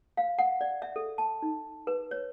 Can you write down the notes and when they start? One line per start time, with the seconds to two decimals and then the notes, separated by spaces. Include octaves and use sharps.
0.17 F5
0.39 F#5
0.61 D5
0.82 E5
0.96 A4
1.18 A5
1.42 D#4
1.87 B4
2.11 C#5